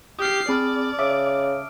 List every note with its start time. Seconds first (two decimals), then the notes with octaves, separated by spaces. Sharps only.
0.19 G4 D#6 F6 C7
0.49 C4 G#4 D5 A5 B5 F6
0.99 C#3 E5 D6 D#6 D7